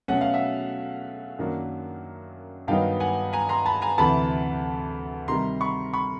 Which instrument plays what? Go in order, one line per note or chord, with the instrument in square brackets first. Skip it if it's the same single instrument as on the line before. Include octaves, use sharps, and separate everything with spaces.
[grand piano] B2 F#3 A3 C#4 F#5
F5
E5 F#5
F#2 D#3 F#3 A#3 D4
G2 D#3 F#3 B3 D#4 F5 G5
F#5 G#5
G#5 A#5
A#5 C6
A5 B5
G#5 A#5
D2 C3 E3 A5 B5
C3 D#3 G3 A#5 C6
B5 C#6
B5 C#6